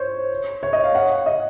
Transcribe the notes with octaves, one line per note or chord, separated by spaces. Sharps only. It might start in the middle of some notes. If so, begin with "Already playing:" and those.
Already playing: C5 C#5
C#5
D#5
F5
F#5
D#5